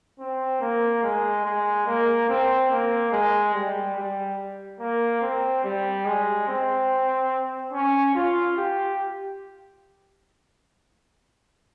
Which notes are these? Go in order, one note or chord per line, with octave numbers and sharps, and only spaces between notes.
C4
A#3
G#3
G#3
A#3
C4
A#3
G#3
G3
G3
A#3
C4
G3
G#3
C4
C#4
F4
G4